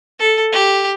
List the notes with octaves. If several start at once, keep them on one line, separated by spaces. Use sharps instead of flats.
A4
G4